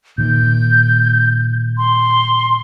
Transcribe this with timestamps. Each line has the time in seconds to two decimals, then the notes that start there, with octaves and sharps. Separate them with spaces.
0.18 A#2 D#3 G6
1.77 C6